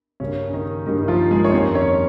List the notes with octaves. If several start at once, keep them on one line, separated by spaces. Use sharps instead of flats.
G2 C#3 G3 A#3 C#4
C#4
D#3 D#4
G2 D#3 G3 A#3 D#4
D#4
F3 F4
G#3 G#4
C#5
F2 D#3 G3 A#3 C4 C5
C#4 C#5